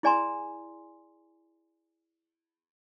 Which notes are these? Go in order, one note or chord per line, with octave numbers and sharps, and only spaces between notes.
E4 G#4 D5 G#5 A#5 C6